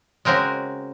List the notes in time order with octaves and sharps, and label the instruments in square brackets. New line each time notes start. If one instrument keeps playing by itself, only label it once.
[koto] C#3 G#3 C4 F#4 A#4